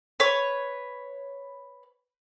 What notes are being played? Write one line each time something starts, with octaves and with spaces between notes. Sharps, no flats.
B4 C#5